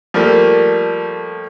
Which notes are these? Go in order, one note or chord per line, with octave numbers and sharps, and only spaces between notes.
F3 G3 A3 A#3